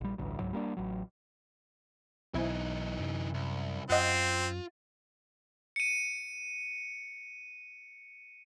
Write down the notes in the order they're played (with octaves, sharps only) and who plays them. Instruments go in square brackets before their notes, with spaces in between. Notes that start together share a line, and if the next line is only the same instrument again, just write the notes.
[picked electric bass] A#1 G3
A1 D2 G2
C#2 G#2 F#3
G3 A#3 C#4 D4
A1 F#3
[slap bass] B1 [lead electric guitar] E3 D#4 [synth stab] C4 E4 G#5
[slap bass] F#2 C3
[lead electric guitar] C2
[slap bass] F#2 [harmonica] C4 [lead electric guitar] F4 [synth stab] D#5 F#5
[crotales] C#7 D#7